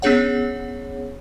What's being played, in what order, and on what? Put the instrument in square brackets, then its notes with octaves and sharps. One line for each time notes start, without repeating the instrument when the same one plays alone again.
[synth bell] B3 C#4 D4 G#4 C#5 F#5